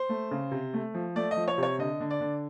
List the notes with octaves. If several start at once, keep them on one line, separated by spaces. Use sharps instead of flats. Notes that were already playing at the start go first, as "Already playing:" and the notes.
Already playing: C5
A3
C#3
C3
A3
F3
A3 D5
D#5
F3
C#5
C3 C#5
D3 D#5
D3
D5
D3